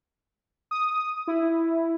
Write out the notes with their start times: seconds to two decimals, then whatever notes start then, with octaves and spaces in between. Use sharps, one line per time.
0.71 D#6
1.27 E4